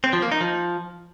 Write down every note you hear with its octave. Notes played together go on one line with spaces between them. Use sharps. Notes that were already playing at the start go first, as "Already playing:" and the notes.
C4
F3
A#3
D#4
F3